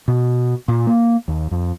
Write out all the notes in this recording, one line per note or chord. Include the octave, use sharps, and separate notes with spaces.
B2
A#2
A#3
D#2
F2